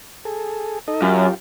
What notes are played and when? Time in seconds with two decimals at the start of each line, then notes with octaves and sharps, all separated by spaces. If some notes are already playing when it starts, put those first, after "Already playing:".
0.25 G#4 A4
0.88 D#4 A4 D#5
1.02 F#2 F4 G4